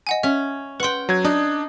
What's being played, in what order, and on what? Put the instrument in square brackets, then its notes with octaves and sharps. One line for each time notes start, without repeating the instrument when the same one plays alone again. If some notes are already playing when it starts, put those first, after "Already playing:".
[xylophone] D#5 F#5 G#5
[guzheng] C#4 [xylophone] E5
[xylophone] B4 C6 [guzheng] F#5 G5
[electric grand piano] F#3 G#6
[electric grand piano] D4 [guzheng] D#4